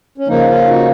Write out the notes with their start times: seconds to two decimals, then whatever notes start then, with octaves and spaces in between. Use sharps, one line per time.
0.18 C#4
0.28 C#3 F3 A#3 D#4
0.48 C#4 F4
0.67 D#4 F#4